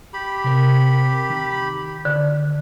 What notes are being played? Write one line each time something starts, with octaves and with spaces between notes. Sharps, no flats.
G4 B5
C3 C4 A#4
D#3
D3